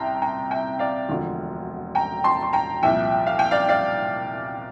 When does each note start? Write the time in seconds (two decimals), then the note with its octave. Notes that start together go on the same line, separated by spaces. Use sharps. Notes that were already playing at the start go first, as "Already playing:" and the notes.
Already playing: C2 C3 G5 A5 A#5 C6
0.22 G5 A#5
0.51 E5 G5
0.79 D5 F5
1.09 E1 D2 D3 F3
1.95 G5 A#5
2.24 A5 C6
2.43 C6
2.53 G5 A#5
2.82 C2 A#2 F3 E5 G5
3.26 F5
3.39 G5
3.51 D5 F5
3.69 D5 F5